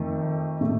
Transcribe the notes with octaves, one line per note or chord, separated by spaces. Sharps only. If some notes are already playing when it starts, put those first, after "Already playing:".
Already playing: F2 D#3 A3
A2 A3